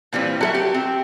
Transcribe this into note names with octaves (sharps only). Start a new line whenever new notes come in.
A#2 E3 G3 C4
F#3 A4 E5
G4
C4